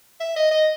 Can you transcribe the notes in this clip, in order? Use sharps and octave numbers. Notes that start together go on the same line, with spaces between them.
E5
D#5
D#5